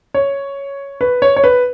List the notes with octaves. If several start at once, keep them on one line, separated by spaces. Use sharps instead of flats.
C#5
B4
C#5
C#5
B4